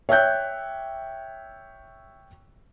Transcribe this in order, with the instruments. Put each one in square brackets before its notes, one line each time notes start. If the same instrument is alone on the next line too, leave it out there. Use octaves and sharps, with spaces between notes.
[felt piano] C#5 E5 G5 F#6 G6